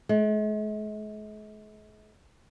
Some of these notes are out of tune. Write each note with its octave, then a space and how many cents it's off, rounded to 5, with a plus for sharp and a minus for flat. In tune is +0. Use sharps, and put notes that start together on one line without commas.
G#3 +45